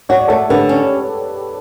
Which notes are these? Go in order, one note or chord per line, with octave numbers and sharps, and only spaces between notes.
F#4 C#5
D5
A3 A4 C#5
D3 G4 B4
C#4